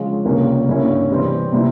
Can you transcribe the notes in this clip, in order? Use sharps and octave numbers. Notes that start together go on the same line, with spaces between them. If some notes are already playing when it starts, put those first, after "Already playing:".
Already playing: C#3 F3 G#3 C#4 F4
C#2 C3 G3 A#3 C#4
G2 G3 A#3 C#4 E4
C3 E3 G3 C4
C3 G3 C4 E4